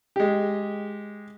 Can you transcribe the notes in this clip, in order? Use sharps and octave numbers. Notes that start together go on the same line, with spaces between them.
G#3 G4